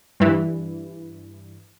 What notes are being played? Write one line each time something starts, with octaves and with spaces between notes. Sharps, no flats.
G2 E3